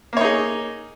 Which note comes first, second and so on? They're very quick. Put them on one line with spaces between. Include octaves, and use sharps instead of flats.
A#3 C#5 D#4 G#4